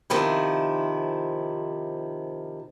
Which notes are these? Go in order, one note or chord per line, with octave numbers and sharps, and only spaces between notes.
C3 D#3 F3 E4